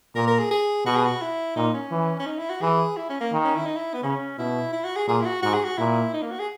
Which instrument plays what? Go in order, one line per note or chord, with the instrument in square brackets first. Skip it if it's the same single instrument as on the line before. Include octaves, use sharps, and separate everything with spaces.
[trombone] A#2 [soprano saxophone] A#4
[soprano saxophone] A#4
G#4
G#4
[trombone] B2 [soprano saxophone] F#4
[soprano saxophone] G#4
F#4
E4
[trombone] A#2 [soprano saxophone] D#4
[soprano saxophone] C#4
[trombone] E3
[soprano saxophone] C#4
D#4
E4
F#4
[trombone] E3 [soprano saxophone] G#4
[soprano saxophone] E4
C#4
A#3
[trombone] D#3
[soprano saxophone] C#4
E4
D#4
E4
B3
[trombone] C#3 [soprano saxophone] C#4
[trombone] B2 [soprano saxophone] E4
[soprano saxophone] E4
F#4
G#4
[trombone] A#2 [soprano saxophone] G#4
[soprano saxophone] E4
F#4
[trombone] G#2 [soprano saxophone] F#4
[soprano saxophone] G#4
F#4
[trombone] A#2 [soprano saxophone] E4
[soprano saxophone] D#4
A#3
F#4
G#4